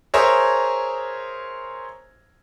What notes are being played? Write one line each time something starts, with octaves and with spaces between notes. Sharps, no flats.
G#4 A#4 C5 C#5 E5